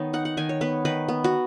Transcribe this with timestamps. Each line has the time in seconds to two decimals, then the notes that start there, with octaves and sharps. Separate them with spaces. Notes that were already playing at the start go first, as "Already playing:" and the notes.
Already playing: D#3 B3 C#5 D#5
0.13 D#4 F#5
0.25 F#5
0.37 D#3 G#5
0.49 C#5
0.61 B3 B4
0.85 D#3 B4
1.09 B3
1.24 F#4